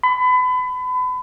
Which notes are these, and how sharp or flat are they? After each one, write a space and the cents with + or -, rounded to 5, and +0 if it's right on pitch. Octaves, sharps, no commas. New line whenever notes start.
B5 +30